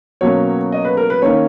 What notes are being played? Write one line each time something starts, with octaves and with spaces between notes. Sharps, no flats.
B2 F#3 A#3 C#4 C#5
D#5
B4
A#4
B4
D#3 A#3 C#4 C#5